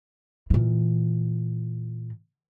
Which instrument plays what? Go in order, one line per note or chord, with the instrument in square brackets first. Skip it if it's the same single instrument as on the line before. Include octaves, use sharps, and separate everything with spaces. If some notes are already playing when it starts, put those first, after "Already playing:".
[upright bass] A#2 E3